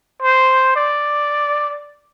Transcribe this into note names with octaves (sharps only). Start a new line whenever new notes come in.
C5
D5